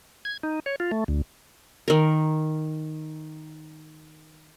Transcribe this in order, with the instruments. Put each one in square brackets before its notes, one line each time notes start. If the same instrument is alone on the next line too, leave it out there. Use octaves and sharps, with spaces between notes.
[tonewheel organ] G#6
D#4
C#5
F4
A3
D2
[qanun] D#3 A#4